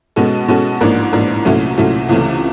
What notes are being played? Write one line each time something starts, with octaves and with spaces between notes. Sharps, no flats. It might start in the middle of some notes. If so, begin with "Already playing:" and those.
B2 G#3 C#4 F#4 A4
B2 G#3 C#4 F#4 A4
A1 G#2 F3 A#3 D4
A1 G#2 F3 A#3 D4
C2 A#2 F#3 A3 C#4
C2 A#2 F#3 A3 C#4
C#2 C3 E3 A3 C#4